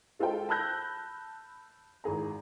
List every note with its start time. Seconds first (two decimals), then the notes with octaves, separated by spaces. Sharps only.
0.19 G#3 F4 A4 C5 G5
0.49 A5 B5 E6 F#6 G6 A#6
2.04 G#1 E4 G#4 A#5